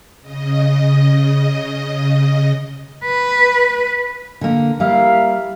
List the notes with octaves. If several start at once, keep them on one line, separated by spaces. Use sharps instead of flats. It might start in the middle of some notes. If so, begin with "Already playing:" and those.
C#3 D#5
B4
D3 A#3
G3 A#3 E4 F5